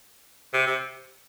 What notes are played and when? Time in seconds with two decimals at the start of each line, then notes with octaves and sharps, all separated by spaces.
0.53 C3
0.67 C3